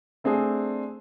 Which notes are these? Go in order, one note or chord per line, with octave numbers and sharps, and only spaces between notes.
A3 C4 D4 G#4